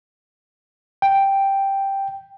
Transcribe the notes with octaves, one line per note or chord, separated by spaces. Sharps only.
G5